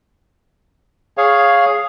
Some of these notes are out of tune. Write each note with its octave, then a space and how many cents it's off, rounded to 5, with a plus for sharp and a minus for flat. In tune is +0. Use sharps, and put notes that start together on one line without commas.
G#4 +0 C#5 +0 F5 +0